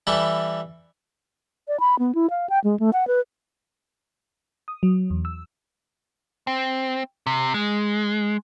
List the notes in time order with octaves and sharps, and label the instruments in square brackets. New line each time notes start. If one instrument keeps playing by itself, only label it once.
[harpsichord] E3 G3 A4 E5 B5
[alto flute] D5
B5
B3
E4
F5
G5
G#3
A3
F#5
B4
[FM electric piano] D#6
F#3
E2
E6
[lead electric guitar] C4
C3
G#3